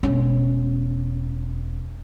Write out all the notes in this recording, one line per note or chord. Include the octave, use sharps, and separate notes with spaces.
E1 C#4